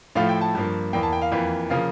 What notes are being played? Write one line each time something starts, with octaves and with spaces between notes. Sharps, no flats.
A2 F3 A3 F5
G5
A5
G2 F3 A#3
E2 E3 A#3 G5
A5
G5
F5
F2 E3 A#3 F5
C#3 F3 A#3 F5